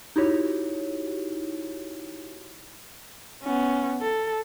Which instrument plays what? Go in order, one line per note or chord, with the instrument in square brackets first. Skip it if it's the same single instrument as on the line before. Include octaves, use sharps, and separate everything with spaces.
[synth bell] D#4 E4 F#4 G4 C#5
[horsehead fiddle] B3 C#4
A4